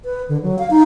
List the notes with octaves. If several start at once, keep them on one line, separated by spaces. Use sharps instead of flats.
B4
D3
F#3
F5
D#4